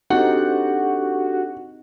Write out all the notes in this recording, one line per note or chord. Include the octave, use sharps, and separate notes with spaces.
C4 D4 D#4 F#4 G4 A4 F#5